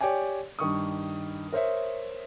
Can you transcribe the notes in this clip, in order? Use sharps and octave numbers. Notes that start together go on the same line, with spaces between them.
G4 C#5 D5 G5 G#5
G2 D#3 C#6 D#6
A#4 C5 C#5 E5